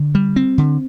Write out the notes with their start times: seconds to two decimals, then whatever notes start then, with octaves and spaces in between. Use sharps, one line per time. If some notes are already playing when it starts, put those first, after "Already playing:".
Already playing: D3
0.15 G3
0.36 C4
0.58 D3